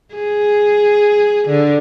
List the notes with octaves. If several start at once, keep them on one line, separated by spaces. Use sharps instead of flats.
G#4
D3